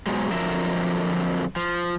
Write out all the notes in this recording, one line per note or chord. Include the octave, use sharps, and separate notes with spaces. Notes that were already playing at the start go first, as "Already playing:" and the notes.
G#2 B2 F#3 G#3
F2 D3 F3 F#3 A#4 E5
F3